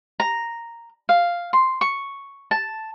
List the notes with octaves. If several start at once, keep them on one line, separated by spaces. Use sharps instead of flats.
A#5
F5
C6
C#6
A5